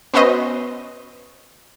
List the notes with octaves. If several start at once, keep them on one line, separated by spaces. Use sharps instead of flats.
B3 C#4 F#4 B4 C5 D#5